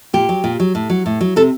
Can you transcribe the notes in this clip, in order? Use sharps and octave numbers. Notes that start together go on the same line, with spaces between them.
A#2 G4
F#3
A#2
F#3
A2
F#3
A2
F#3
C3 A4